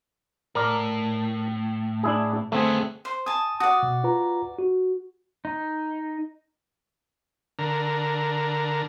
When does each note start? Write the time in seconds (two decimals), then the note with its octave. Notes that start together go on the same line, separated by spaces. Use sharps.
0.55 A2 A#4 D5
2.03 D4 E4 G#4
2.52 D3 A3 B3 C4 G#4
3.05 C5
3.26 G#5 A5 D#6
3.60 F#4 D5 D#6
3.83 B2
4.04 F4 B4 A#5
4.59 F#4
5.45 D#4
7.59 D3 A#4